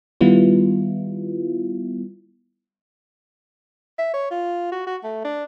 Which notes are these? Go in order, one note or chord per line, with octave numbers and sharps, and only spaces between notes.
D#3 G3 B3 E4 F4
E5
C#5
F4
F#4
F#4
A3
D4